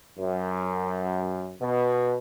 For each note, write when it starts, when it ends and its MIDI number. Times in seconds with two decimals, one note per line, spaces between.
0.18 1.55 42
1.61 2.16 47